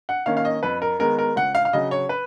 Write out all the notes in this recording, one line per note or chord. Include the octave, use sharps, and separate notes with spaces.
F#5
D#3 A#3 C#4 F5
F5
D#5
F2 B4
A#4
D#3 G#3 B3 A#4
A#4
C#2 F#5
F5
F5
C#3 F#3 D#5
C#5
B4